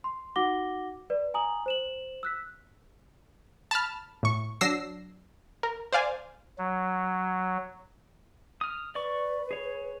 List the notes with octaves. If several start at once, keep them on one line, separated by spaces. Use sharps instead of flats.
C6
D#4 F#4 F#5 D6 A#6 G7
B4 D5
G#5 A#5 D#6 F#7
C5 E7 F#7
E6 F#6 B6
A5 B5 F6
A2 C#6
F#3 D4 E6 A#6 C7
A#4
C5 D5 F5 G#5
F#3
D#6 F6
B4 D5 C#6
G#4 C#5